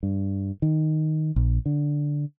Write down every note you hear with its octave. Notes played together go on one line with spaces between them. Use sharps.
G2
D#3
A#1
D3